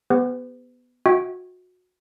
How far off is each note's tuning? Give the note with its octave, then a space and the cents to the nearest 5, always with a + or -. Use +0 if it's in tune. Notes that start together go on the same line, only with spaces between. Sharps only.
B3 +0 G4 +45 B4 +40
F#4 -25 E5 -40 G5 -15